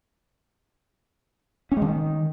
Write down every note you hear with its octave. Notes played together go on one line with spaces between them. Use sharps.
C#4
G#3
D#3